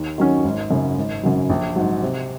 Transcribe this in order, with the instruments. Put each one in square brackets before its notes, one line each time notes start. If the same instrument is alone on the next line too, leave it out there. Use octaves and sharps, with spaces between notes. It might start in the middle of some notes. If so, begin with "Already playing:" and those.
Already playing: [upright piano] D#2
D#3 F#3 C#4
G#1
F#2 C#3
G#1
F#2 C#3 F#3
A#1
G#2 F#3
C3